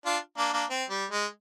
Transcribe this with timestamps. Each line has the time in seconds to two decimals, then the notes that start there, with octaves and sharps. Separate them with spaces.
0.06 D4 F4
0.37 A#3 D4
0.53 A#3 D4
0.70 C4
0.90 G3
1.12 G#3